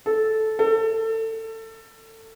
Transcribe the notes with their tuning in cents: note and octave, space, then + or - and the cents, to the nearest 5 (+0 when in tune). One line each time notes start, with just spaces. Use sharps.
A4 -10
A4 +25